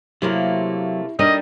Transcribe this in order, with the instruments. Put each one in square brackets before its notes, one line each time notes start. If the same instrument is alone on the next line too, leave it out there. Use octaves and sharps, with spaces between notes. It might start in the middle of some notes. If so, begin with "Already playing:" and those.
[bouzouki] C3 A3 A#3 [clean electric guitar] F#3 [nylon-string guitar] E4
[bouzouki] G3 [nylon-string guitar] D4 D#4 A#4 [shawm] D#5